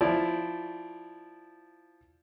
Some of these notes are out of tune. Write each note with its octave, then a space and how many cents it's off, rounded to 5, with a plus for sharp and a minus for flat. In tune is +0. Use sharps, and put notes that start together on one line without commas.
F3 +0 E4 +0 D5 +0